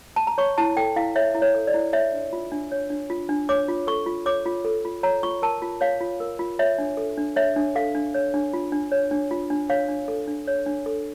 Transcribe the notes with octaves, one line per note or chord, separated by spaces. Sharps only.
A5
A#5
C#5 C#6
E4 A5
A4 G5
E4 F5
C#5 E5
E4
C#5
A4
D5
E4
C#5 E5
D4
F4
D4
C#5
D4
F4
D4
C#5 D6
F4
A4 C#6
F4
C#5 D6
F4
A4
F4
C#5 A#5
F4 C#6
A#4 A5
F4
C#5 F5
F4
A#4
F4
C#5 E5
D4
A4
D4
C#5 E5
D4
A4 F5
D4
C#5
D4
F4
D4
C#5
D4
F4
D4
C#5 F5
D4
A4
D4
C#5
D4
A4